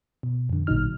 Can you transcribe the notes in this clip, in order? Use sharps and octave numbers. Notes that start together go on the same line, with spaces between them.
B2
F2 D3
A1 A#2 D3 F#3 D#4 F6